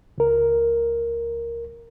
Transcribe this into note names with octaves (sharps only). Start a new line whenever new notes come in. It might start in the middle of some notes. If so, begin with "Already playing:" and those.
C#2 A#4